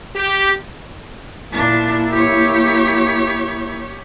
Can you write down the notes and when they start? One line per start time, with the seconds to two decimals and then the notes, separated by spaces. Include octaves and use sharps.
0.16 G4
1.53 A#2 A#3 D4 E4
2.11 G4 C#5